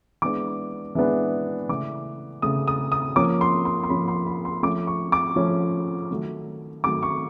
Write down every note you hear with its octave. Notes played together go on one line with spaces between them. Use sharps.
E3 G#3 B3 D4 D6
E3 G#3 B3 D4
C#3 E3 A3 D6
C#3 E3 A3 D#6
D#6
D#6
F3 A#3 C#4 D6
C6
C6
C6
F3 A#3 C#4 B5
C6
B5
C6
F3 A3 C#4 D6
C#6
D6
F3 A3 C#4
D#3 F#3 A3
D#3 F#3 A3 D6
C#6